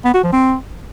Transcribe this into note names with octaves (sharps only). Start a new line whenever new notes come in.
B3
F#4
F3
C4